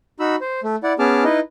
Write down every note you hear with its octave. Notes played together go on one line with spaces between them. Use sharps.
D#4 F#4 B5 E6
C5
A3
E4 D5 F#5
B3 C#4 G#4 A5 D6 F6
D#4 E4 B4 D#5